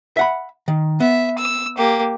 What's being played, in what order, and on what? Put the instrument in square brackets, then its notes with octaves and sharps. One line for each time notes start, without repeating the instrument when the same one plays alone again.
[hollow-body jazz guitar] E5 F#5 B5
D#3
[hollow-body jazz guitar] B3 [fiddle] E5
[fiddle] E6
A#3 G4